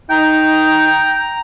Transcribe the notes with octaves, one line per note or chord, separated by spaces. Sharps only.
D#4 G5 A#5